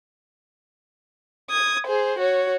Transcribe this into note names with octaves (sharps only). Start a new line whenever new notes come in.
D#6 G#6
G#4 C5
F#4 C#5